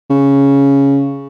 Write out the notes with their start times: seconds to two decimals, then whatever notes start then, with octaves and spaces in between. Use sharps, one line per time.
0.10 C#3